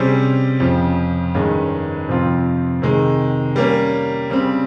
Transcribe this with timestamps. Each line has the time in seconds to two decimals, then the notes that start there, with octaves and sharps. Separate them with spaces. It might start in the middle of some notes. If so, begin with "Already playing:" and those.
Already playing: C3 G3 C#4 G#4 C5
0.60 F2 C#3 F3
1.35 G2 D#3 G#3 C#4
2.08 F2 C3 F3 C4 F4
2.82 C3 D#3 G#3
3.56 G3 A#3 C#4
4.30 C#3 G3 C4